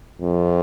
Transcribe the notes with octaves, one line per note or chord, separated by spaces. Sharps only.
F2